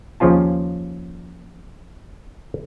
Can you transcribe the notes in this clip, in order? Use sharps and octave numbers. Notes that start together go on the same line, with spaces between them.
D#2 C#3 F3 C#4 F4 A5